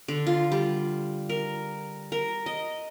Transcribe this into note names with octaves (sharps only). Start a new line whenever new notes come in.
D3
F4
G3
A#4
A#4
D#5